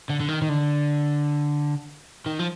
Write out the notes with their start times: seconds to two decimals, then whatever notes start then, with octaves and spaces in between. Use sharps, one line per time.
0.09 D3
0.20 D3
0.28 D#3
0.42 D#3
0.49 D3
2.26 D#3
2.39 F3